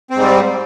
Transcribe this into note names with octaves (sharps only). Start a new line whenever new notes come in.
G#2 G3 C4